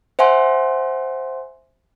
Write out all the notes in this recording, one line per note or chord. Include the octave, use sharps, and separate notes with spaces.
C5 E5 F#5 G#5 C6